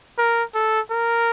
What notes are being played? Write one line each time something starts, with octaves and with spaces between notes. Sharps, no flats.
A#4
A4
A#4